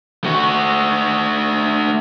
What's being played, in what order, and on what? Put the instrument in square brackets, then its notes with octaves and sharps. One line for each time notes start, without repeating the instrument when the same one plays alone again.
[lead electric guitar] A3 F#4